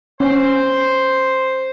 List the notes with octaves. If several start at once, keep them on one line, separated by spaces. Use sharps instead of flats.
C#4 C5